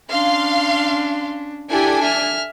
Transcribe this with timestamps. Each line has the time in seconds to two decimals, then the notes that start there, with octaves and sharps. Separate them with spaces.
0.10 C#4 D4 F5 C6
1.70 D4 E4 G4 A4 G#5
2.02 E5 F6